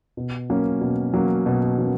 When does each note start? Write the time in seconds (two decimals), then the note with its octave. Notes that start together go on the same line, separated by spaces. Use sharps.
0.17 B2
0.50 F#3 A#3 C#4
0.81 B2
1.14 F#3 A#3 C#4
1.46 B2
1.78 F#3 A#3 C#4